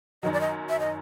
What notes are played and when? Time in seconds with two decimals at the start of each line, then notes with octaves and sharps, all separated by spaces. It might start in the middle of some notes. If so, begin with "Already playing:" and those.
0.23 F#2 D#3 F#3 D#5
0.33 D5
0.40 D#5
0.69 E5
0.80 D#5